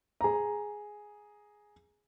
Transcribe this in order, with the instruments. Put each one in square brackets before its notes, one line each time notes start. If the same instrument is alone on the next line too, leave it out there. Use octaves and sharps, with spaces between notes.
[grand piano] G#4 A#5